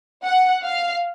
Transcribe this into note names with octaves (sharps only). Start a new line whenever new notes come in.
F#5
F5